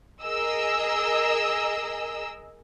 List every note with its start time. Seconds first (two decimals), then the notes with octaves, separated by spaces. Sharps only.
0.24 G#4 A#4 D#5 E6